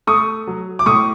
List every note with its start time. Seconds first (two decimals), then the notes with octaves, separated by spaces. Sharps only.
0.07 A3 C#6 D#6
0.47 F#3
0.79 D6
0.86 A2 C#6 D#6